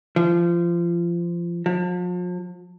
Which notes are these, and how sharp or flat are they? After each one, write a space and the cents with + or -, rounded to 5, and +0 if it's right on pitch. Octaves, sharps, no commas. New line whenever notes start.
F3 -25
F3 +40